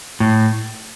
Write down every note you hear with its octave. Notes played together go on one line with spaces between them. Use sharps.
A2